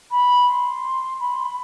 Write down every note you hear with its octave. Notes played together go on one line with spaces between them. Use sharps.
B5
C6
B5
C6
B5